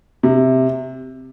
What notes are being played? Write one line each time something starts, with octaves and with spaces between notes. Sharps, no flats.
C3